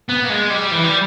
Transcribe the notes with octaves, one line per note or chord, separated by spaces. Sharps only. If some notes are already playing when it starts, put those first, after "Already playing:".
B3
A#3
G#3
G3
E3
G3